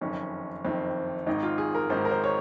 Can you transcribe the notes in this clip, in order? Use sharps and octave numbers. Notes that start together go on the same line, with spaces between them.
F#1 F2 D#3 C#4
F#1 F2 D#3 C4
G#1 G#2 D#3 D#4
F4
G#4
A#4
G#1 G#2 D#3 C5
A#4
C5
C#5